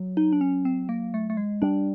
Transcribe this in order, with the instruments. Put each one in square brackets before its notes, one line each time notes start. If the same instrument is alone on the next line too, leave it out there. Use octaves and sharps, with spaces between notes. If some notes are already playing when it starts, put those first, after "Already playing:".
Already playing: [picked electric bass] F#3
[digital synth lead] D#4
D4
C#4
C4
A#3
A3
A3
G#3
[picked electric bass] G3 [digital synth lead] D4